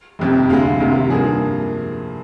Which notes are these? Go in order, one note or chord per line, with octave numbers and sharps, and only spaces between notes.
F1 F2 C3
D2 D3 G#3 F5
D2 C3 D#3 G#3
G2 F3 A#3 G#4